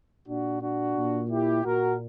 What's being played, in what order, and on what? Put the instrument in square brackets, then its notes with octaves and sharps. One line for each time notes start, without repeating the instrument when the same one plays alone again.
[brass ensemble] A#2 D4 F#4
D4 F#4
A#2
E4 G4
A#2 F#4 A#4